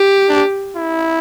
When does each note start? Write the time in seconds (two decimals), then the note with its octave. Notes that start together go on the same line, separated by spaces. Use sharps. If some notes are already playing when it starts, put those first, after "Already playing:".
Already playing: G4
0.29 D4
0.76 E4